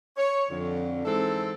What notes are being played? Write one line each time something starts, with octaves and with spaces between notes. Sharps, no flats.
C#5
F2 D3
G#2 E3 C4 A4